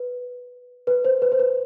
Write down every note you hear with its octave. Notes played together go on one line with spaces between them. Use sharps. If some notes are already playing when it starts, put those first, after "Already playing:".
Already playing: B4
B4
C5
B4
C5
B4